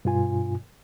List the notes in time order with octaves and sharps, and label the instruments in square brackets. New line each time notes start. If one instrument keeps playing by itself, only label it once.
[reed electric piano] G2 B2 F4 G#5